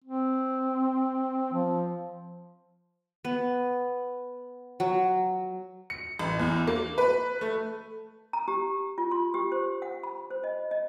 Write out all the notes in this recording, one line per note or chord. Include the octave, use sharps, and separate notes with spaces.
C4
F3
B3
F#3
C#7
A1
E2
A#3
B4
A3
A#5
G4
F4
C6
G4
C5
F#5
B5
C5
D#5
D#5